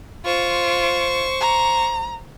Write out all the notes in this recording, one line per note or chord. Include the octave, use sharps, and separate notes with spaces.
F4 C5 C#6
A#5